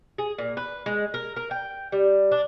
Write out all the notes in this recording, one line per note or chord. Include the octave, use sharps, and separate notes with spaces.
G#4
A#2
B4
G#3
A#4
A#4
G5
G3
D4